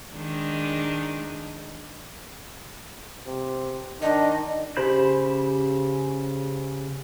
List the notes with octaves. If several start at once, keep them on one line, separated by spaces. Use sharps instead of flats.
D#3 G#3 D4
C3
D#3 D4 D#5
C#3 G4 C5 B5 G6